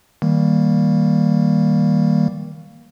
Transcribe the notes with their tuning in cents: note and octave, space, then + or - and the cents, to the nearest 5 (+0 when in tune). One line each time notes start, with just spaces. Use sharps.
D#3 +25 G3 +0 A#3 +0